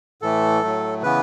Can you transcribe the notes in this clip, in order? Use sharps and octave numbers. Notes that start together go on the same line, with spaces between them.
A2 E3 A3 A4
A2 F#3 A3
C#3 E3 B3 B4